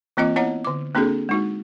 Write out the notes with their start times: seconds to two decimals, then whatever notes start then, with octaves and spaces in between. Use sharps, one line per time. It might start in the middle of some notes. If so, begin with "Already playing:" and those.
0.17 E3 A#3 C4 F4 D#5
0.36 B3 E4 C#5 D#5 F#5 A#5
0.65 D3 D6
0.95 A#3 C4 D4 F#4 G#4 A4
1.29 G#3 D#4 F#4